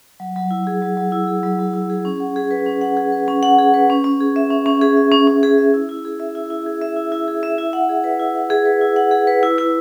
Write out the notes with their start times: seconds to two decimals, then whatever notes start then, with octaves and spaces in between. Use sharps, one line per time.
0.20 F#3
0.36 F#3
0.51 E4
0.67 G#4
0.82 F#3
0.97 F#3
1.12 E4
1.27 G#4
1.43 F#3
1.59 F#3
1.74 E4
1.90 G#4
2.05 C#4
2.20 F#5
2.36 G#4
2.51 B4
2.66 C#4
2.81 F#5
2.97 G#4
3.12 B4
3.28 C#4
3.43 F#5
3.58 G#4
3.74 B4
3.90 C#4
4.04 C#4
4.21 G#4
4.36 E5
4.50 C#4
4.66 C#4
4.82 G#4
4.97 E5
5.12 C#4
5.27 C#4
5.43 G#4
5.58 E5
5.74 E4
5.89 E4
6.05 G#4
6.20 E5
6.35 E4
6.50 E4
6.66 G#4
6.81 E5
6.96 E4
7.12 E4
7.28 G#4
7.43 E5
7.58 E4
7.73 F#5
7.89 G#4
8.04 B4
8.20 E4
8.35 F#5
8.50 G#4
8.66 B4
8.81 E4
8.96 F#5
9.11 G#4
9.27 B4
9.43 E4
9.58 E4